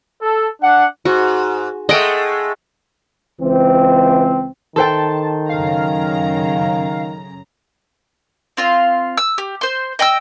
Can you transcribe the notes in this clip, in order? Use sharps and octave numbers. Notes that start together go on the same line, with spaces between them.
A4
D4 F#5
G#2 F#4
G#3 A3 D#5 F#5 G5
C#2 E3 C4
D#3 A4 C5 G5 A5
F#2 C#3 F5 A#5
C4 F4 F5
E6
G4
C5 C6
D#5 G5 B5 E6